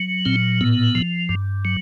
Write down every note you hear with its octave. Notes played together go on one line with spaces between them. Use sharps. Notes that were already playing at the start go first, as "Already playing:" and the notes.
Already playing: F#3
A#2 C4
A2 B3
F3
G2
F#3